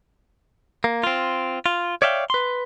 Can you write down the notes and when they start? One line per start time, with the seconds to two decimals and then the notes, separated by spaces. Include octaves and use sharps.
0.84 A#3
1.04 C4 F4
1.66 F4
2.02 C#5 D5 E5 F5 G5
2.30 B4 C6